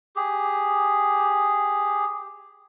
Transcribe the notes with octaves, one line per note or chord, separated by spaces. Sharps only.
G4 G#4